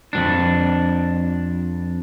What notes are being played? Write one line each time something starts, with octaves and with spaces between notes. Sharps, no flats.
F2 G#2 D4